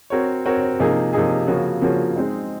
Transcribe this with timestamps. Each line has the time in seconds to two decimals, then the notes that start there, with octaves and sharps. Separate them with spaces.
0.10 C4 F#4 A#4 C#5
0.46 C4 F#4 A#4 C#5
0.79 C3 F3 A#3 D#4 G#4
1.13 C3 F3 A#3 D#4 G#4
1.47 C#3 F3 A#3 C#4 F#4
1.82 C#3 F3 A#3 C#4 F#4
2.16 G#3 C4 D#4